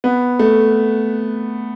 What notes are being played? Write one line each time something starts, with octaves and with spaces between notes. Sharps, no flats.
B3
A3